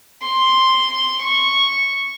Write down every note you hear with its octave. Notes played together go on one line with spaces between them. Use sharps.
C6
C#6